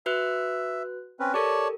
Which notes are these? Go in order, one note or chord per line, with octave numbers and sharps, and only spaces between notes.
F#4 B4 E5 F#6
C4 C#4 B4
G4 A4 A#4 C#5 D5 A5